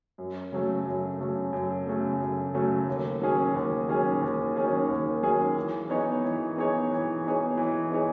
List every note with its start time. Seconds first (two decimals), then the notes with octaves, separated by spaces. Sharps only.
0.18 F#2
0.52 C#3 F#3 A3
0.85 F#2
1.19 C#3 F#3 A3
1.53 F#2
1.87 C#3 F#3 A3
2.20 F#2
2.54 C#3 F#3 A3
2.88 D#2
3.21 D#3 F#3 C#4 G#4
3.54 D#2
3.88 D#3 F#3 C#4 G#4
4.21 D#2
4.56 D#3 F#3 C#4 G#4
4.88 D#2
5.23 D#3 F#3 C#4 G#4
5.57 E3
5.90 B3 D#4 G#4 C#5
6.24 E3
6.57 B3 D#4 G#4 C#5
6.91 E3
7.24 B3 D#4 G#4 C#5
7.57 E3
7.91 B3 D#4 G#4 C#5